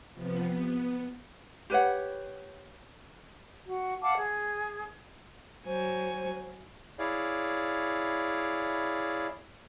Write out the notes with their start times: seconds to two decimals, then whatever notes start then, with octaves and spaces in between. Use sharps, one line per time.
0.13 C3 F3 B3
0.49 B3
1.70 G4 B4 C#5 F#5
3.65 F#4
4.02 F5 F#5 A5 D6
4.18 G#4
5.66 F#3 C5 G#5
6.99 E4 G#4 C#5 D5 F5